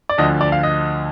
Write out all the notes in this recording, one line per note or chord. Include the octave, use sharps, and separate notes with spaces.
D5
D2 D3 F3 D#5
D5
F5
D#5